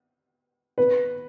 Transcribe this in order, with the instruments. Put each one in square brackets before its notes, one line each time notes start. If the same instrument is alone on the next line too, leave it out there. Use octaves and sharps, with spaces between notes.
[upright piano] B4